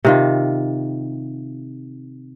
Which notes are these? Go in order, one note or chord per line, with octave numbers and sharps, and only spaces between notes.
C3 D#3 F4